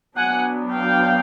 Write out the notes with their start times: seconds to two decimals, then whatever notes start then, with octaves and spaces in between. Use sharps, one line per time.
0.16 F#3 B3 D4 F#5 G#5
0.71 F5 G5